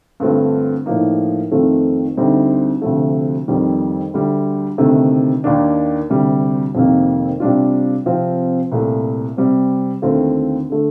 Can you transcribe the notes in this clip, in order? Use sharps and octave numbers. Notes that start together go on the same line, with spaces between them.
G2 D3 A3 C4 F4
A2 F3 A#3 D#4
F2 D#3 A3 C4 F4
D2 D3 G3 C4 D#4
D2 C3 F3 A3
F2 D#3 G3
D2 D3 G3
D2 C3 D#3 A3 D#4
D#2 D#3 A#3 D4
D2 C3 G3
F2 C3 D#3 A#3
C3 G3 D4 F4
C3 F3 C4 F4
C2 A#2 A3
C3 G3 C4
D#2 D3 A3 C4 F4
D3 A3